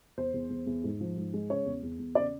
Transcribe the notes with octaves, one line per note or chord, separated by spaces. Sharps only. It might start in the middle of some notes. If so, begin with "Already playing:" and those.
E2 C5
E2
E2
E2
G#2
F3
G#2
G#3
C#3 C#5
E2
E2
E2
C#3 D5